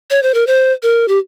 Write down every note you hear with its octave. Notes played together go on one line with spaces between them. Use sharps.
C#5
C5
A#4
C5
A#4
G4